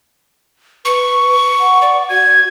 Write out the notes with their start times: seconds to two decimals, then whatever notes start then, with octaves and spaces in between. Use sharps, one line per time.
0.85 B4 C#6
1.59 F#5
1.82 D5
2.09 F#4 G#6